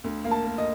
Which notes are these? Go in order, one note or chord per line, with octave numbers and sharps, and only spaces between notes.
D2
A#3
A5
A#3
D#5